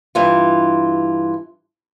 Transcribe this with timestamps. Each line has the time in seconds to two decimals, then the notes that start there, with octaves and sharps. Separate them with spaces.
0.15 G2 E3 F4